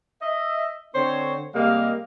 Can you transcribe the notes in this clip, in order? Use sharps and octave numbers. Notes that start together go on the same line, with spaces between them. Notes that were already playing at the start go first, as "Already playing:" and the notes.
D#5 E5
D3 C4 C5 C#5
C3 G3 G#3 A#3 D#5 F5